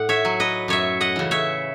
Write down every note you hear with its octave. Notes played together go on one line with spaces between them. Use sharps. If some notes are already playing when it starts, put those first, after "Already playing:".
Already playing: A2 F#5
C#5 E5
F#3
B4 D#5
F#2 C#5 E5
D#5 F#5
C#3 E3
C#5 E5